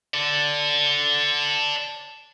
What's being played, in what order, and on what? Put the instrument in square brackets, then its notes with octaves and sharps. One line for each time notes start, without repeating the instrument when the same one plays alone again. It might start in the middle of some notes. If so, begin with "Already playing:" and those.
[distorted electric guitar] A4 D5